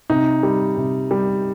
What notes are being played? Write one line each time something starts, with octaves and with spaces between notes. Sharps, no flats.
C3 D#4
G3
C3
G3